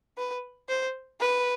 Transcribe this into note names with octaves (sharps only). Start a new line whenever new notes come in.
B4
C5
B4